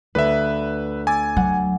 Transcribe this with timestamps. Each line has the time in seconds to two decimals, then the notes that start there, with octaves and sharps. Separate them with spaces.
0.15 D2 B4 E5
1.07 G#5 D6 E6 A6
1.37 F#3 F#5